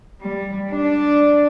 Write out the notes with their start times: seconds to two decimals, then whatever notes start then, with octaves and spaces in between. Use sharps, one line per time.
0.20 G3
0.68 D4